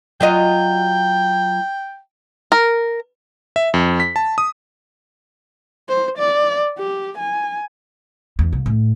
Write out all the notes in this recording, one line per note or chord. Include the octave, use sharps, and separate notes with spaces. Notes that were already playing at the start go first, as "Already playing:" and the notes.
F#3 F4 D#5 G5
A#4
E5
F2
B6
A5
D#6
C5
D5
G4
G#5
E2
C2
A2